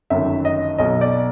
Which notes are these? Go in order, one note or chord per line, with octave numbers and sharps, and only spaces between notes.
G1 F#2 D#3 E5
D#5
B1 B2 D#5
D5